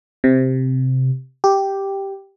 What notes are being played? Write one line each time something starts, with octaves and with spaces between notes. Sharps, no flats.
C3
G4